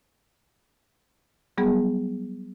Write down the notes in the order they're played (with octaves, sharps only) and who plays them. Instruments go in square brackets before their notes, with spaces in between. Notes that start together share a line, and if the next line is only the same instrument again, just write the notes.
[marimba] F#3 G3 B3 G#4